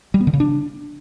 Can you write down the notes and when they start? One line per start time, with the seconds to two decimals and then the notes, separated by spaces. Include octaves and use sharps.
0.14 G3
0.21 B3
0.27 D3
0.33 C#3
0.40 D4